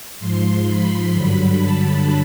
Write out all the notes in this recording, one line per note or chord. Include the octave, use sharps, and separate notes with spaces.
G#2 F3 C6
B5
G2 D3 F#3 B5
A5